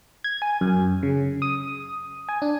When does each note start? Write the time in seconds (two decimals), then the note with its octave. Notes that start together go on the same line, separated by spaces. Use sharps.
0.24 G#6
0.42 G#5
0.61 F#2
1.03 C#3
1.42 D#6
2.29 G#5
2.42 D4